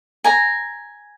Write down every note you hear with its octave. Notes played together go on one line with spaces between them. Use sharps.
G#5 A#5